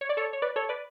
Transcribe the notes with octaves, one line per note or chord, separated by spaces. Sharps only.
C#5
D5
A4 C#5
C#5
B4 D5
A4 C#5
B4 D5